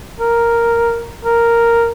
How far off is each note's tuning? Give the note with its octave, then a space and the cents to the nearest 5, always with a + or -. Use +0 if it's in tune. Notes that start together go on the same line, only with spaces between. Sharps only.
A#4 +0
A#4 -5